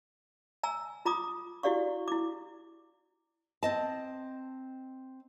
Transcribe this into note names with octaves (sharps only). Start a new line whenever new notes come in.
G#5 A#5 E6
F4 A#5 D6 D#6
E4 F#4 G4 D5 F5 C#6
E4 D6
C4 D#5 A5